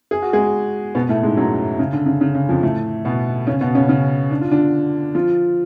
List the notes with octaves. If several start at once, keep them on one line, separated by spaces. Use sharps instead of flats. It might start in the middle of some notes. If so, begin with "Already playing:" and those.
G#4
F#4
G#3 G#4
B2 B3
A2 A3
G#2 G#3
F#2 F#3
C#3
D3
C#3
C#3
C#3
F2 F3
A2 A3
B2 B3
C#3 C#4
B2 B3
C#3 C#4
C#3 C#4
D4
F4
D3 D4
F3 F4